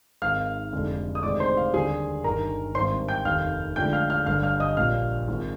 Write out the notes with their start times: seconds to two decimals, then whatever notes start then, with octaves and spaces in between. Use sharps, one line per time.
0.22 G#1 G#2 D#3 G#3 F5 F6
0.73 F1 F2 D3 G#3
1.15 D#6
1.23 D2 C3 D#3 G#3 D5 D6
1.40 C5 C6
1.57 F5
1.74 D#2 D3 G3 G#4 G#5
2.24 G1 G2 D#3 A#4 A#5
2.75 G#1 G2 D#3 C5 C6
3.08 G5 G6
3.25 F1 D#2 D#3 F5 F6
3.76 D2 D3 F3 G#3 G5 G6
3.93 F5 F6
4.10 F5 F6
4.26 G1 G2 D3 G3 F5 F6
4.43 F5 F6
4.60 D#5 D#6
4.77 A#1 A#2 G3 F5 F6
5.28 G#1 G#2 F3 G#3